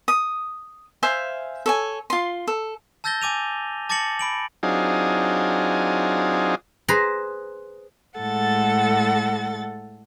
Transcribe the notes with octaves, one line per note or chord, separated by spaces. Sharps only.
D#6
C5 E5 F5 G#5
A4 C#5 G#5
F4 C6
A4
A5 E6 G6 A6 A#6 G7
G#5 D6 D#7 F7
A5 D6 A6 A#6 C#7 F#7
B5 D7 F#7
F#3 C4 D4 D#4 F4 G#4
G#4 B4 C5 A#5
A2 G#3 A4 F#5 A6